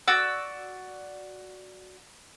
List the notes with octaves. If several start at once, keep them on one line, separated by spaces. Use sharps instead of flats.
F#4 D5 E6